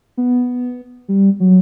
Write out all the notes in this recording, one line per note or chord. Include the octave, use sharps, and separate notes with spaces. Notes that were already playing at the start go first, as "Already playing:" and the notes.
B3
G3
F#3